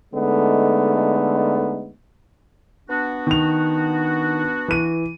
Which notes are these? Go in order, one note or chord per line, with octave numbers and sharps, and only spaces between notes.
D3 G#3 A3 B3 D#4
B3 D4 F#4
D#3 F7
E3 D#7